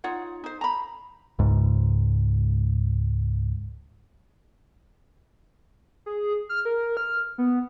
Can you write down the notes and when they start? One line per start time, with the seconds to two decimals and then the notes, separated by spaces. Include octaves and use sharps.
0.04 D#4 F4 C#5 F#5
0.44 D#4 C5
0.61 A#5 B5
1.39 C#2 G#2
6.06 G#4
6.49 F6
6.65 A#4
6.97 F6
7.38 B3